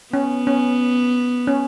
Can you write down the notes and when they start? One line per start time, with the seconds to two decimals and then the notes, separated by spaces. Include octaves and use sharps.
0.13 B3 C#4
0.47 C#4
1.47 C#4